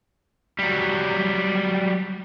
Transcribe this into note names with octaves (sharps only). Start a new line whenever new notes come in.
F#3 G3